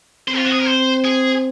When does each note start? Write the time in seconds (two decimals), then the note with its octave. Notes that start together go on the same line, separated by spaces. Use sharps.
0.28 C4 C5
0.38 F4
0.46 F#4
0.52 G#4
0.60 A#4
0.66 C5
1.04 G#4